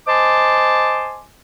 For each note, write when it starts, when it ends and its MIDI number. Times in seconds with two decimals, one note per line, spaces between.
0.08 1.21 72
0.08 1.21 75
0.08 1.21 80
0.08 1.21 81
0.08 1.21 84
0.08 1.21 86